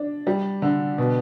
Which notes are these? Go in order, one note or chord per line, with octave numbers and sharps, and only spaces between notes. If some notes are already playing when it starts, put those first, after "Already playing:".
Already playing: D4
G3
D3
B2